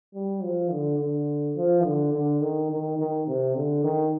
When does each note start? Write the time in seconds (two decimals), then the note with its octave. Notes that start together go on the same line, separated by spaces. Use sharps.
0.14 G3
0.43 F3
0.72 D3
0.99 D3
1.56 F3
1.84 D3
2.13 D3
2.41 D#3
2.71 D#3
2.99 D#3
3.28 C3
3.55 D3
3.84 D#3